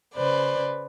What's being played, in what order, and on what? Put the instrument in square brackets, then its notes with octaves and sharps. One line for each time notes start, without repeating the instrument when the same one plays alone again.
[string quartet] C#3 B4 C5 D5